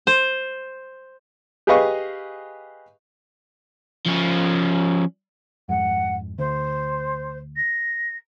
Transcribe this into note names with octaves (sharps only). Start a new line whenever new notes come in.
C5
G4 G#4 B4 D#5 F5 C#6
F3 C#4
F2 G#2 F#5
D2 C5
A#6